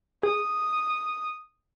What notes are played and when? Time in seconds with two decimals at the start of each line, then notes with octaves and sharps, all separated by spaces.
0.23 G#4 D#6